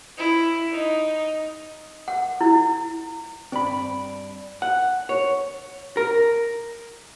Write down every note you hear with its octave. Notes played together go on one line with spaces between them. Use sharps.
E4
D#4
F#5
E4
G2 C4 D5 B5
F#5
C#5
A#4